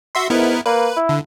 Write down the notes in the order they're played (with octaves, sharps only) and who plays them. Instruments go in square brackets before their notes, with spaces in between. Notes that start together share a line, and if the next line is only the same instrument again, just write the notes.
[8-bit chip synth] F#4 E5 C6
[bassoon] G#2 [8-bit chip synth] B3 E4 A#4
[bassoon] A#3 [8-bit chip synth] B4
[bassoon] E4
[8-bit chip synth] D3